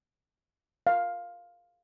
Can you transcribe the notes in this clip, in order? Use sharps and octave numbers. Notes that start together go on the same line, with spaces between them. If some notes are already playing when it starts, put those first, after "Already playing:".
F5